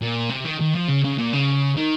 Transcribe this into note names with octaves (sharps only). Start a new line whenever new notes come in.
A#2
C3
D#3
D#3
F3
C#3
C#3
A#2
C#3
D#3